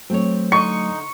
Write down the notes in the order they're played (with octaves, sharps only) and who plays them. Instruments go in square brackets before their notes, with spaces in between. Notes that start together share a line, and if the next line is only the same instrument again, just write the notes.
[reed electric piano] F#3 A3 [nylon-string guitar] C4 C#5
[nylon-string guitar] D3 D#5 [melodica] D#4 [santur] C#6